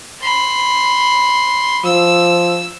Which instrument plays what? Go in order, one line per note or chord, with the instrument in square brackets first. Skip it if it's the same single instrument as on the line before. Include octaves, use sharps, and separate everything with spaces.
[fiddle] B5 C6
[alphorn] F3 [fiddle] E6